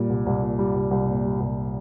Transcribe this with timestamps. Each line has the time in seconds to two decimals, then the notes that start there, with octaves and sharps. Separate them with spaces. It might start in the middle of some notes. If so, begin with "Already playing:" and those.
Already playing: A#2 G3
0.09 C2
0.26 C2
0.41 A#2
0.59 G3
0.75 C2
0.91 C2
1.07 A#2
1.24 G3
1.40 C2